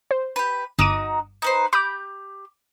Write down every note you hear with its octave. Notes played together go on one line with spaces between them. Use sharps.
C5
G4 B4
G1 D#4 F#4 D6 D#7
D#4 B4 C5
G4 B5 D6 G6